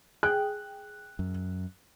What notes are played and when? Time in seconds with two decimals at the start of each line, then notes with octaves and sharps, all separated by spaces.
0.23 G#4 G5 F#6
1.19 F#2